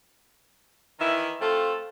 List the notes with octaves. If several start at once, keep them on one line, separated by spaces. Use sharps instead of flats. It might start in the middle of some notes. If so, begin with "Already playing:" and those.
D#3 E3 E4
A3 C4 F4 A4